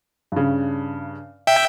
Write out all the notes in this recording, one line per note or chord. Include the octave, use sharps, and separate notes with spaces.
G2 C#3
E5 G5